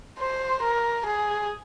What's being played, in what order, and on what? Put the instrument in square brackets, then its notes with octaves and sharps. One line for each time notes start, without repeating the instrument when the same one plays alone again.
[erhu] C5
A#4
G#4